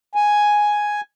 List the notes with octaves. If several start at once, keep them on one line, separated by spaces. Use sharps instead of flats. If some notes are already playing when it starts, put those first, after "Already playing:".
G#5